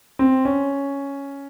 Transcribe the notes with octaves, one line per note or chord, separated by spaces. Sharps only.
C4
C#4